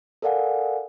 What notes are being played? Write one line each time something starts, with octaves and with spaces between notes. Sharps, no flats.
A4 A#4 D5 F5 F#5 G#5